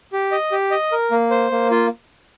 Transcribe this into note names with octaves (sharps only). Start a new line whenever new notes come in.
G4
D#5
G4
D#5
A#4
A#3
C5
A#3
F4